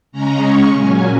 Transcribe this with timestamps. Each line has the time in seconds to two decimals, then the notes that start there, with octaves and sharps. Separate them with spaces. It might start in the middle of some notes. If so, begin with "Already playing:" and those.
0.12 C#3 G#3 C#4 A#5
0.43 C#6
0.74 A#2 F#3 C#4 G#5